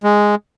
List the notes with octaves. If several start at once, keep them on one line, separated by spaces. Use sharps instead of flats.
G#3